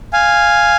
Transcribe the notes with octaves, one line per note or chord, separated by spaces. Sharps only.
F5 G#5